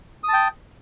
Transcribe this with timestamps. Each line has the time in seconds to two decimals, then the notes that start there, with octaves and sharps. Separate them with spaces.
0.24 D#6
0.28 A5
0.33 G5